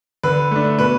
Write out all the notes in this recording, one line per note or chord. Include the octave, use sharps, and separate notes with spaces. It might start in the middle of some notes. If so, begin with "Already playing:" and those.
D3 B4
A3 D4
B2 B4